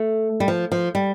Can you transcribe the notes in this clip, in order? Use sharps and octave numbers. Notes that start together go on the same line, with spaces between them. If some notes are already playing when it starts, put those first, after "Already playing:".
Already playing: A3
G3
F3
F3
G3